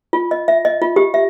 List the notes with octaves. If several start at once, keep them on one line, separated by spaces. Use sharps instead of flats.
F4
D#5
E5
D#5
F4
G4
E5